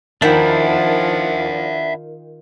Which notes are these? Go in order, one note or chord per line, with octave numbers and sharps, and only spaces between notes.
D#3 F3 D4 E4 E5 F#5